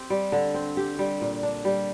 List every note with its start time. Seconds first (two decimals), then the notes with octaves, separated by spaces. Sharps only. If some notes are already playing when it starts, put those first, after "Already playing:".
Already playing: C4 G4
0.10 G3
0.32 D3
0.54 C4
0.77 G4
0.99 G3
1.21 A#2
1.43 D4
1.65 G3